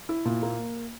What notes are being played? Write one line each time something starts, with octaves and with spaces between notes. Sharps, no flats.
E4
A#2
A#3